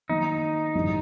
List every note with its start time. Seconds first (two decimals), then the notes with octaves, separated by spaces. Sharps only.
0.09 D#3 F#3 A#3 D#4
0.75 A1 G2 D3 G3